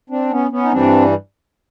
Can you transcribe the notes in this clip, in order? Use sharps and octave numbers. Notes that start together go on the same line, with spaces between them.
C4 D4
B3 C#4
B3 C#4
D#4
G2 E3 G3 C4 D4